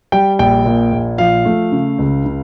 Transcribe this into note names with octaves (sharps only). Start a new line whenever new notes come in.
G3 G5
A#1 G5
A#2
A#1
F3 F5
A3
C#3
C#2
C#3